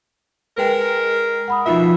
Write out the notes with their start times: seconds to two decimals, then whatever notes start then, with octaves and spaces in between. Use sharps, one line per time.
0.58 G#3 A#4 B4 G5
1.48 F#5 B5 D#6
1.66 B2 F3 D#4 F4 E5